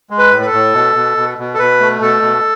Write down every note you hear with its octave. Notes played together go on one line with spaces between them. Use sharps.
G#3
B4
A2
B4
A4
A2
B2
B2
B2
B2
A4
B2 B4
A3
B2 A4
B2